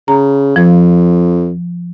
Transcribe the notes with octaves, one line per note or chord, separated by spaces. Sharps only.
C#3 A#5
F2 F3